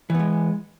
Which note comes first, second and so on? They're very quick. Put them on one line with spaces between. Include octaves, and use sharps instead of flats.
E3 B3 G#3